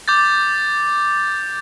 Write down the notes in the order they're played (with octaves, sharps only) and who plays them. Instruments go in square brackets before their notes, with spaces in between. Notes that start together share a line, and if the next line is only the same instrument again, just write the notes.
[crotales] D6 G6 A6